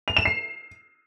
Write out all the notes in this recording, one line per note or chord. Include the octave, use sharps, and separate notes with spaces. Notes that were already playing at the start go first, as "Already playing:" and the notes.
F7
E7
C7